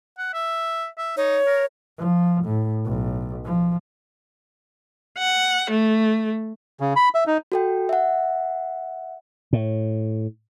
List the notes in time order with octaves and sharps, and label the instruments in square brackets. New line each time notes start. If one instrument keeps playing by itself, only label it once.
[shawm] F#5
E5
E5
[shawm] D#4 [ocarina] C#5
[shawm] A#4
[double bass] F3
A2
B1
F3
[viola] F#5
A3
[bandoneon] C#3
B5
E5
D#4
[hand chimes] F#4 A4 G5
E5 F#5
[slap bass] A2